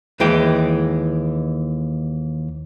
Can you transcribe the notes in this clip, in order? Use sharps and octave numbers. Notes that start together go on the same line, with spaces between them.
D#2 E3 G#3 G5